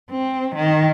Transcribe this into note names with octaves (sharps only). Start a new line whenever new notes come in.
C4
D#3